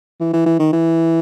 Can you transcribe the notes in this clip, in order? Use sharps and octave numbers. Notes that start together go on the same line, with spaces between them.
E3
E3
E3
D#3
E3